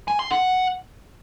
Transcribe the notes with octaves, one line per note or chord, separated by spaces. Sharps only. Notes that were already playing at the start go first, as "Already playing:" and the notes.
G#5
C6
F#5